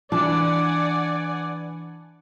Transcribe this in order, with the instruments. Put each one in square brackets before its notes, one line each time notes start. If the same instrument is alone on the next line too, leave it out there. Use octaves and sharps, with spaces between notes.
[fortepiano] E3 A5 [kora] D4 [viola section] D5 F#5 G#5